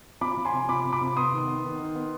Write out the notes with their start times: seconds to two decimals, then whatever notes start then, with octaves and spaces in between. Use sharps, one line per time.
0.21 F3 B5 D6
0.37 F3
0.45 G#5 C6
0.53 C3
0.69 F3 B5 D6
0.85 C3
0.93 B5 D6
1.01 C3
1.16 B3 C6 D#6
1.32 D#3
1.48 B3
1.64 D#3
1.80 D#3
1.95 B3